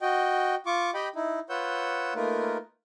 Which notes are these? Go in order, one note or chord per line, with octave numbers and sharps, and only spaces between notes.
F#4 D#5 G5
F4 C#6 D6
G4 D#5 G5 B5
D#4 E4
F4 B4 C#5 F#5 E6 G6
A3 A#3 D#4 F4 A#4 B4